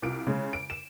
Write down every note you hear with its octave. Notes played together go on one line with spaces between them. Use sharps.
C2 F4 D7
C#3 G#3
D7
E7